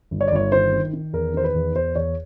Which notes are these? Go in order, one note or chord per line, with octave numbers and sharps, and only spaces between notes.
G1
C#5
D5
G1 C#5
D#3 C5
D#3
D#3
E2 A#4
D#3 C5
B4
E2
E2 C5
E2 C#5